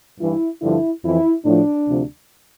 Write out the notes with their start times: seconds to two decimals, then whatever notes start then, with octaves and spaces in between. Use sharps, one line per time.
0.19 G2 E3 E4
0.61 G2 D3 F3 E4
1.03 F2 E3 E4
1.44 A2 F3 D4
1.86 D2 C3 F3